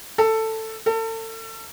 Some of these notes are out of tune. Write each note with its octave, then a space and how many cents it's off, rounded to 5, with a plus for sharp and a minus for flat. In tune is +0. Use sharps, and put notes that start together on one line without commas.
A4 +10
A4 +35